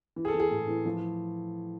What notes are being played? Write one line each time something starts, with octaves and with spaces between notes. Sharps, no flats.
E3
G#4
A4
E3
G#4
A2
E3
F3